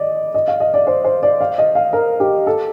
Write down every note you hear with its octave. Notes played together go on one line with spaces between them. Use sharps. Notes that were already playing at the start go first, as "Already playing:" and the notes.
Already playing: D5 D#5
D#5
F5
D#5
D5
C5
C5
D5
F5
D#5
F5
A#4
G4
A4